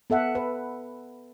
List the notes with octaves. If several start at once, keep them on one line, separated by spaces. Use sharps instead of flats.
B3 A4 E5 F#5
B4